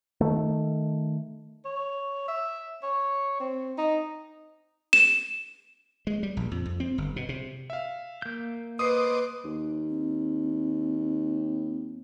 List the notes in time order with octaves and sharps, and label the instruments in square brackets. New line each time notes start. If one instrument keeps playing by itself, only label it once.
[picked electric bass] D#3 A3
[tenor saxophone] C#5
E5
C#5
C4
D#4
[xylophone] E7
[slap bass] G#3
G3
A#1
F2
F2
C4
G1
B2
C3
[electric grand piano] E5 F5
[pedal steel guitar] A#3 G6
[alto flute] B4 [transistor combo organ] C5 D#5 D6 [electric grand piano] D#6 C7
[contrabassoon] D#2
[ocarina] C4